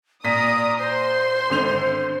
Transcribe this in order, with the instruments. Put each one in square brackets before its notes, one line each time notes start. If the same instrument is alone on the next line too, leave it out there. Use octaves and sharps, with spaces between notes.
[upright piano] A#2 B6 D#7 [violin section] D5 D#6 [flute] A#5
[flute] C5 [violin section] C6
[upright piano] G#1 D3 F7